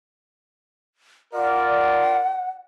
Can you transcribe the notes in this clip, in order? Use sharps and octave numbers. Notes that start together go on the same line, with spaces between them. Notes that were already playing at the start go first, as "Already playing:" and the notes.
F4 A#4 D5 F#5